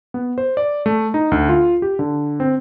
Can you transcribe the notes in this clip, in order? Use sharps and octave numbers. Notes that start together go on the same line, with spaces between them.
B3
C5
D5
A3
D#4
D2
F4
G4
D3
C4